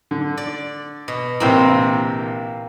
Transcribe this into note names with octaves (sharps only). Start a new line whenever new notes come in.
D3
D5
B2
A#1 C3 E3 A#3 C4